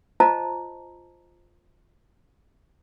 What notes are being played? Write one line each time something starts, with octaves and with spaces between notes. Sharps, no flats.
F4 C5 D#5 A5 A#5